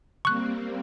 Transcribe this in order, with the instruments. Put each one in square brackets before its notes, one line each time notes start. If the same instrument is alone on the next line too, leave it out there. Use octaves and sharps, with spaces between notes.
[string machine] G3 A#3 C4 [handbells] C#6 F#6